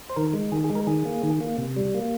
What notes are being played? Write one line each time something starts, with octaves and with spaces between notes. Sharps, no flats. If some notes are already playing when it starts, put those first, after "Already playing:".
C5
D#3 A#4
G#3
D#3 G#4
G#4
G#3
A#4
D#3 G#4
A#3
D#3
A#3
C3
G3
A#3